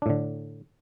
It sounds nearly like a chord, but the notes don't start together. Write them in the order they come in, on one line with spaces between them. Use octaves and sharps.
D4 A2 D3